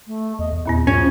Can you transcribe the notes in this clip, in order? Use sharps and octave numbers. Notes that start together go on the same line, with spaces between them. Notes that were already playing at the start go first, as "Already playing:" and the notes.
A3
E2 D#5
E2
D#2 A#2 B3 E4
G2 F3 C#4